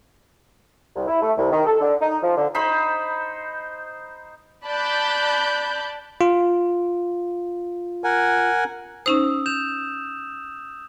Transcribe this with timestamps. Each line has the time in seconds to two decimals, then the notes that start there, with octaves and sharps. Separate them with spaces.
0.96 C2
1.08 E4
1.22 A3
1.37 C2
1.51 D#3
1.66 A4
1.81 D3
2.01 D#4
2.23 F3
2.37 D3
2.54 D#4 C5 B5
4.64 D5 A5 B5 F#6 G6
6.21 F4
8.04 A#4 F#5 G#5
9.06 C#4 D#4 C5 D#6 E6
9.46 G6 E7 F7